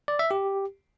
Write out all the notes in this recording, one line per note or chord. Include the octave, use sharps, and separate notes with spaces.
D5
E5
G4